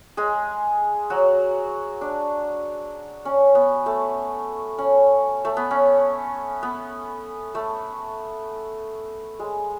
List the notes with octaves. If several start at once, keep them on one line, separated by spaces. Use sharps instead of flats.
G#3 G#4
F#3 F#4
D4
C#4
B3
A3
C#4
A3
B3
C#4
B3
A3
G#3